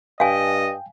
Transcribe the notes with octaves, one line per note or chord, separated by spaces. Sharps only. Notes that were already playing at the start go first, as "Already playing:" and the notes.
G2 D#5 F5 G5 G#5